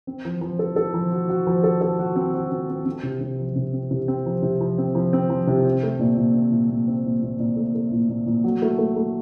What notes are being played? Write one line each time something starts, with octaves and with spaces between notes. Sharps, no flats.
C4
F3
F3
A4
A4
F3
F#4
F#4
F3
A4
A4
F#4
C4
F#4
C4
C4
C4
C3
C3
F3
C3
C4
C3
C4
F3
C3
F3
C4
F3
C4
F3
C3
C4
A3
A#2
A#2
C4
A#2
A#2
C4
A#2
A#2
A#2
A3
A3
A#2
A#2
A#2
F#3
A3
A3
A3